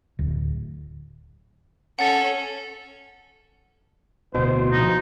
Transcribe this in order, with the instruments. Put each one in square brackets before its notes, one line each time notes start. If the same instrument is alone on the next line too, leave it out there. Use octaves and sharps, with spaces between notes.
[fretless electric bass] D1
[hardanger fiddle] C#4 A4 [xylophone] F#5 A6
[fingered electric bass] D1 D3 [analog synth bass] B2 [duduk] C5
[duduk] F3 [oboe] D#4